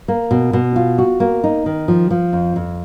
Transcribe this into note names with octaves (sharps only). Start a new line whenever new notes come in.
A#3
B2
B2
F4
F#4
A#3
D#4
D#3
F3
F3
F2
F2